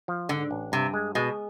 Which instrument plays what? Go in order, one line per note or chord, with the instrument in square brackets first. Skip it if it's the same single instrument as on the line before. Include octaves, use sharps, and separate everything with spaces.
[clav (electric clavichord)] F3
[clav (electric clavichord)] G#2 [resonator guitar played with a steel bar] D3
[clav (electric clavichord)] A1
[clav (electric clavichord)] G2 [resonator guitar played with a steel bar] C3
[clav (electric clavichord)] G#3
[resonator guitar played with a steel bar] B2 [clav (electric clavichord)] G#3